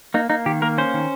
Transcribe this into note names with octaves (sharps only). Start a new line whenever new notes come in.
A#3 D#4
A#3 D#4
D#3 G4
A#3 A#4
C#4 C5
D#3